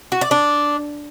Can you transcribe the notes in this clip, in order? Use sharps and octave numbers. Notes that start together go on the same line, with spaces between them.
F#4
D5
D4